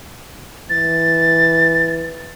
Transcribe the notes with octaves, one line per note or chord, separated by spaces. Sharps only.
E3 A6